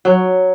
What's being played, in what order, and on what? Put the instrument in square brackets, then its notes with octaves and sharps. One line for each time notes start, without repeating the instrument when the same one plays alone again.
[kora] F#3